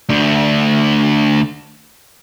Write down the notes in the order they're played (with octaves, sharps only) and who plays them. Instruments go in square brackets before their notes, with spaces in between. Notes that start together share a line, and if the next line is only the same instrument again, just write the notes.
[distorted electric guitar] D2 D3